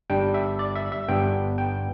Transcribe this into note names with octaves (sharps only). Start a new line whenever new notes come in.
G1 G2 G3 D4 G5
E5
D5
E5
E5
G1 G2 G3 B3 D4 G5
G5